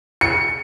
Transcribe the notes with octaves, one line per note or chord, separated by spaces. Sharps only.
C#7